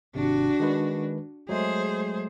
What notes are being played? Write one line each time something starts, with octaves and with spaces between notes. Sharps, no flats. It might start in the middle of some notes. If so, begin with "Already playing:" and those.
G#1 C3 D4 F#4
D#3 G#3 B4
F#3 G#3 A3 G#4 C5